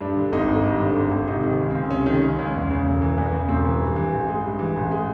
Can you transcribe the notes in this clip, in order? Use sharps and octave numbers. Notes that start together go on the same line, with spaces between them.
G2 D4
D3
G#1 D#4
G#1
G2
D3
G#1
G#1
C3 D#4
D#3
C#2
C#2 C4
C3 C#4
D#3 C#4
C#2 C#4
C#2 C#4
E2
C#3
E1
E3
E2 B3
C#3
E1 C4
E3
G2
E3
A1
G#3
G2
E3
A1
G#3